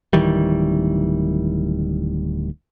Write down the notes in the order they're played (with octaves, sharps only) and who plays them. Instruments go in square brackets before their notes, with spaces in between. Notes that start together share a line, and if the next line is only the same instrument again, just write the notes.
[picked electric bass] D1 D#3 E3 G3